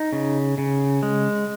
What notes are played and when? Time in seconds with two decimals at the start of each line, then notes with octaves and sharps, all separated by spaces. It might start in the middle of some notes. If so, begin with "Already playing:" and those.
Already playing: D#4
0.13 C#3
0.58 C#3
1.03 G#3